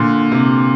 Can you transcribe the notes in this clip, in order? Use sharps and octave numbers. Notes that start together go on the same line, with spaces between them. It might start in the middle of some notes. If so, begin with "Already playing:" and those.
Already playing: A#2 D3
C3